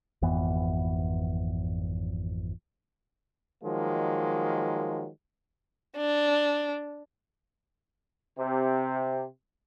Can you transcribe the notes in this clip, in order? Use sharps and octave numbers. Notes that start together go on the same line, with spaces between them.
G#1 F2 E3 B3
D#3 F3 F#3 G#3 A#3
D4
C3